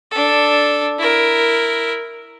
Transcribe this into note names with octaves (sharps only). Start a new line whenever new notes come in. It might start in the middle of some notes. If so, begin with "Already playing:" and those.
D4 A4
E4 A#4